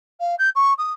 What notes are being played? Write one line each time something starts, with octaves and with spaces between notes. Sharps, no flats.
F5
G6
C#6
D#6